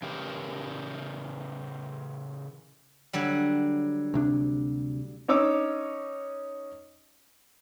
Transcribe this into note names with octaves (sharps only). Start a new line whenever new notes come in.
C#3 E3 G4 A#4
D3 F#3 G3
D2 C3 D4
C#4 D#4 C#5 D6 E6